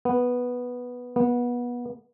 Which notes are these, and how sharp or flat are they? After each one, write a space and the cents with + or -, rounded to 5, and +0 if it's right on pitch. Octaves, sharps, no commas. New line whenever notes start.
B3 -5
B3 -25